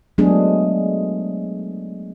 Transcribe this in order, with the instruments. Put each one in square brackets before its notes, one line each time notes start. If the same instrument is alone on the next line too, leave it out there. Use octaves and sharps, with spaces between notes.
[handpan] F#3 G#3 A3 B3 D4 G#4